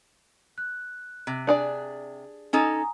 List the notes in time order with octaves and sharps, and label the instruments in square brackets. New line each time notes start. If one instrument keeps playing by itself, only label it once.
[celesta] F#6
[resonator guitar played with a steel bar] C3
[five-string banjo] D4 G#4 D5
[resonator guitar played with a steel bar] C#4 D#4 A4 [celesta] G#5 A#5 D#6